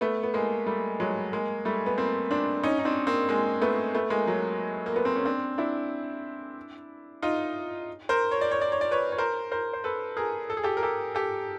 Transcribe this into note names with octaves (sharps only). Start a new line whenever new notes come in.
A3 B3
B3
G#3 A#3
G3 A3
F#3 G#3
G#3 A#3
G3 A3
B3
A#3 C4
C4 D4
C#4 D#4
D#4
C4 D4
A#3 C4
G#3 A#3
A3 B3
A3 B3
G#3 A#3
F#3
A#3
B3
C4
C#4
C4 D4
D4 E4
D#4 F4
A#4 C5
C#5
D5
C#5
D5
C#5
D5
B4 C#5
C#5
A#4 C5
A#4 C5
C5
A4 B4
G#4 A#4
A4
G#4
G4 A4
A#4
G4 A4
G4 A4